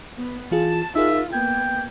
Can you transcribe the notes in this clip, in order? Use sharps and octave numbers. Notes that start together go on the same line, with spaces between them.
B3
E3 F4 G#4 A5
D#4 F4 G#4 A#4 E5
A#3 B3 G5 G#6